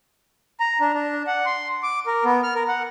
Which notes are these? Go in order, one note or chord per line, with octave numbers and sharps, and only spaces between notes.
A#5
D4
D4
F#5
C6
D6
A#4
B3
F6
A#4
F#5